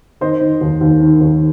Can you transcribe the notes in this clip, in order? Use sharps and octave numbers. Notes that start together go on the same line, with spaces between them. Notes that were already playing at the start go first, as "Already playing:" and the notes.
D#3 C5 D#5
D#3
D#2
D#2
D#3
D#2